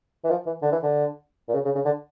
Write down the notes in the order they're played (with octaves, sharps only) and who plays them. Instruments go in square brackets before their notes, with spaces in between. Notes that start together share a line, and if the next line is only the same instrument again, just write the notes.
[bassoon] E3
F3
E3
D3
E3
D3
A#2
C#3
C#3
C#3
D3